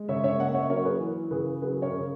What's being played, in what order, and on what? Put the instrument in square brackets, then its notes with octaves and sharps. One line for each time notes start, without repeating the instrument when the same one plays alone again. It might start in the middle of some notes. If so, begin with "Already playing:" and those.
Already playing: [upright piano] G#3
C#3 C#5 E5
C#5 E5
A#3 D#5 F#5
C#5 E5
F#3 A#4 C#5
G#4 B4
E3
C#3 G#4 B4
F#3 G#4 B4
A#4 C#5
C#3